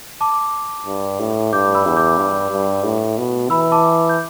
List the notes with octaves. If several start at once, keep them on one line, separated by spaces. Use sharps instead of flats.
A5 D6
G2
A2
G2 D6 G6
B5 E6
E2
D6 G6
G2
G2
A2
B2
E3 B5 E6
A5 D6
G6